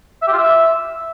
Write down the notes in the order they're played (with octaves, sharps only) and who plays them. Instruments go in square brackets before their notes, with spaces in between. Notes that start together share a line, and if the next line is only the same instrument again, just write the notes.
[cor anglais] E5
G4
F4
E5